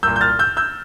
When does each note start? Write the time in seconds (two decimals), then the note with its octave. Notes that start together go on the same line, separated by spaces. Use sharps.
0.03 C2 A#2 E6 G6
0.16 G6
0.21 F6 A6
0.39 E6 G6
0.57 E6 G6